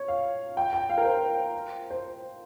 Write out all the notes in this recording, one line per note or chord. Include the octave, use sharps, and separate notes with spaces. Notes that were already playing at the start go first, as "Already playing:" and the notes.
Already playing: C#5
F5
G5
G5
F5
A#4
C5
C5